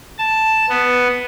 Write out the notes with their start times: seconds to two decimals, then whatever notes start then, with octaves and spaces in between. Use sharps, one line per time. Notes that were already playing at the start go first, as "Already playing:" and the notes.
0.18 A5
0.69 B3